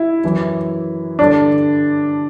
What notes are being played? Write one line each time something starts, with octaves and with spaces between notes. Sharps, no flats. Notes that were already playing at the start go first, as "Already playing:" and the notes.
Already playing: E4
F#2 E3
G2 D3 D4